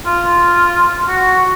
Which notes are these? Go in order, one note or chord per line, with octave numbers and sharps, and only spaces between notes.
F4
F#4